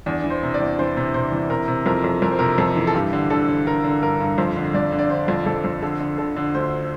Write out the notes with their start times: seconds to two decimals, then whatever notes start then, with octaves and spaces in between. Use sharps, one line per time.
0.06 E2 D4
0.24 E3
0.30 C5
0.43 C3
0.54 D5
0.60 E2
0.79 E3 C5
0.97 C3
1.14 C3 C5
1.32 E3
1.50 C3 A#4
1.68 C3
1.86 F2 A#4
2.04 F2
2.22 F2 A#4
2.31 C5
2.39 C3 A#4
2.58 F2 A4
2.76 E3
2.87 A4
2.94 G2 G4
3.13 D3
3.30 D3 A4
3.48 D3
3.66 D3 A#4
3.84 D3
4.02 G2 A#4
4.20 G2
4.38 F2 C5
4.56 D3
4.74 F2 D5
4.92 D3
4.99 D5
5.10 D3 C5
5.28 F2
5.46 F2 A4
5.64 F2
5.82 D3 A4
6.00 D3
6.18 D3 A4
6.36 D3
6.54 D2 C5